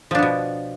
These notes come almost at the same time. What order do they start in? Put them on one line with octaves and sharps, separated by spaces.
F3 D4 B3 B2